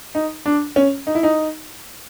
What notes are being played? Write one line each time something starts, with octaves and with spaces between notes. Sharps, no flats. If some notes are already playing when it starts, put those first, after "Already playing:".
D#4
D4
C#4
D#4
E4
D#4